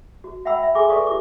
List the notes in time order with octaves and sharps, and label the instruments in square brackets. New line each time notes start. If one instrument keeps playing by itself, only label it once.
[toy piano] F#4
E5 F#5 G5 B5 E6
E5
G#4 A4 E5 G#5 C6 D6
A4 B4 D5 F5 C#6 D#6
F4 G4 D6